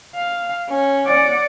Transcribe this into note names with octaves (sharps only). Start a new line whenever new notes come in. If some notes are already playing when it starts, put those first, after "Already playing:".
F5
C#4
D5 F#5